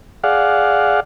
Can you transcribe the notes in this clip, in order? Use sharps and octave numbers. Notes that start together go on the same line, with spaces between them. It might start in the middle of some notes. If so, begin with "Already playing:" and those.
G#4 D5 F5 F#5